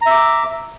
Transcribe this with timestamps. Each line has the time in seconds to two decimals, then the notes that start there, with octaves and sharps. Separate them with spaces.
0.01 A#5
0.06 E5
0.11 D6